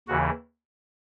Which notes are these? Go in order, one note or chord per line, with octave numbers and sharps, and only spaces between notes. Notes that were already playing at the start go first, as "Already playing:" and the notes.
D#2 C#3 E3 F#4